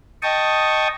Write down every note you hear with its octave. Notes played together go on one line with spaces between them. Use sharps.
D#5 G5 A5 C#6 D#6